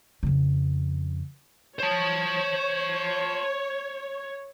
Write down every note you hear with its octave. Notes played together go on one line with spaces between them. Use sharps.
F2 C#3
C5 C#5 A5